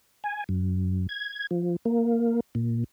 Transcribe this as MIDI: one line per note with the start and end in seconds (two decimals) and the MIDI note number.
0.24 0.44 80
0.49 1.07 42
1.09 1.47 92
1.51 1.76 53
1.85 2.40 58
2.55 2.84 46